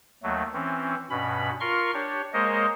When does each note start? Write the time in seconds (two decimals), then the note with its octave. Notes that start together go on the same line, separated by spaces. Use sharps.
0.23 D#2 F#3 A3
0.54 E3 C4 C#4
1.10 G2 B2 C#4 B5
1.60 F4 A#4 C6 C#6 F6
1.94 D4 G4 C#5
2.33 G#3 A#3 A#4 C5 C#5 D#5